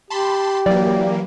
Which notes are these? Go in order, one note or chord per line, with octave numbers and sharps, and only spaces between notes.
G4 A5 B5 C6
E3 F#3 A#3 D5